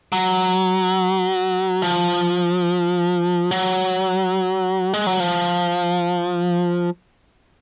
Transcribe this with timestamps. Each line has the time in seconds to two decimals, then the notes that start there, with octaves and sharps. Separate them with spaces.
0.12 F#3
1.82 F3
3.51 F#3
4.93 G#3
5.07 F#3
5.20 F3